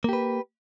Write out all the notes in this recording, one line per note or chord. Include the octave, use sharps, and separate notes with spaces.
A#3 G4 B4